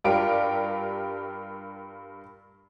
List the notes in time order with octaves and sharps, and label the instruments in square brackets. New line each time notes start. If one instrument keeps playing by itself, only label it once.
[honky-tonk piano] G2 F4 G4 A#4 D7